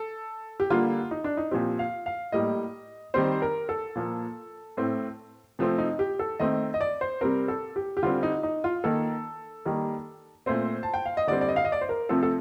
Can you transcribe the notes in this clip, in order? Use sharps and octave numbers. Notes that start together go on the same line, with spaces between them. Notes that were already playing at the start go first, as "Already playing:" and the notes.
Already playing: A4
G4
D3 G3 A#3 F4
D#4
D4
D#4
A#2 F3 C4 G4
F5
F5
A2 G3 A#3 D#5
D#3 G3 C4 C5
A#4
A4
A#2 F3 A#3
A2 A3 C4
C3 F3 A3 C4
D#4
G4
A4
D#3 A3 C4 D#5
D#5
D5
C5
C3 G3 C4 A#4
A4
G4
G4
D3 G3 C4 F4
D#4
D#4
F4
D#3 A#3 A4
D#3 G3 A#3
A#2 A3 C4 C5
A5
G5
F5
D#5
D3 G3 C4 D5
D5
D#5
F5
D#5
D5
C5
A#4
C3 F3 A3 C4 A4
A4